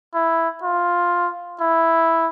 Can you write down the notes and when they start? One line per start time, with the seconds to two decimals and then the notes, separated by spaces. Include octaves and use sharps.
0.14 E4
0.63 F4
1.61 E4